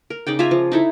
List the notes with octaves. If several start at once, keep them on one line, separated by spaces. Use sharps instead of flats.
A#4
C#3 D#4 D5 G5
F4 E5 G#5 A#5
F3
D#4 E4 A4